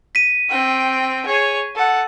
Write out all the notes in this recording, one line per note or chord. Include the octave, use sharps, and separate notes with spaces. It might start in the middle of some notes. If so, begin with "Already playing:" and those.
B6 D#7
C4 G5
G#4 C#5
A4 F#5